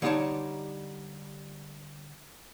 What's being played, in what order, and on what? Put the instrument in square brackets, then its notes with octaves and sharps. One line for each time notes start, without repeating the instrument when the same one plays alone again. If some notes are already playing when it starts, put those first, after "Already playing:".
[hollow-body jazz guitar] D3 G3 D#4 G4 C#5 A5